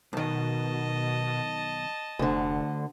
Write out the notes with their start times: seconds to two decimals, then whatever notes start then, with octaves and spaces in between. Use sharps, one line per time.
0.13 B1 B2 D#3 D#5 A5
2.19 F1 D2 D3